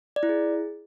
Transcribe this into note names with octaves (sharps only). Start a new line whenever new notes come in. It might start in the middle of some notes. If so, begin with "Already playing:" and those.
D5
E4
G#4